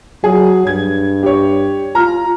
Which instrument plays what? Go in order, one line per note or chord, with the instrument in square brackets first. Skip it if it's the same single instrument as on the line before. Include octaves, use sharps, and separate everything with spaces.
[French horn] F#3 [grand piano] G#4
[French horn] G2 [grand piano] G#6
[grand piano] G4 C#5
[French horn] F4 [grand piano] A#5 F6